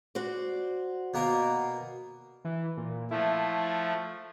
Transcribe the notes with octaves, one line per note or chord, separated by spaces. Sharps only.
F#4 C5 D5
B2 A#3 A#4
E3
A#2
F3 A3 E4